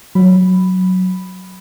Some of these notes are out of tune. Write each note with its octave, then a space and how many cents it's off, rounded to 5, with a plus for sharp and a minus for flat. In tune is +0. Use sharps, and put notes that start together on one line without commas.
F#3 +0 B5 +0